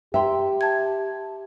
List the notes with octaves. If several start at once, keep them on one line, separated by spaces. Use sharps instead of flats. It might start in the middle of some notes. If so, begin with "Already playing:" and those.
G4 E5 G5 A#5 C6
A5 G#6